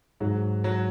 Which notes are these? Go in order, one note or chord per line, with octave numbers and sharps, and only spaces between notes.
G#2 F#3
F#3